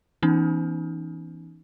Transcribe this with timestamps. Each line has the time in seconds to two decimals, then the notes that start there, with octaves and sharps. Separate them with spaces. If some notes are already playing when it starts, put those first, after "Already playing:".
0.23 E3 B3 C#4 D#4